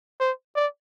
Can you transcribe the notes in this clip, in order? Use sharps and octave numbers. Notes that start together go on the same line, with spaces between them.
C5
D5